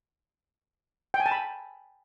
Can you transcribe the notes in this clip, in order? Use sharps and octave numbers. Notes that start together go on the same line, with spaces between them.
G5
G#5
A5
B5